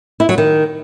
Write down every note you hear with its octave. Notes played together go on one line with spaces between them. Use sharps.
E4
F#3
D#3